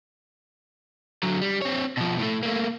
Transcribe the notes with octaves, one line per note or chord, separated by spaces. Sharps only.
D3 F#3
G3
C4 C#5
B2 F3
A2 A3
A3 A#3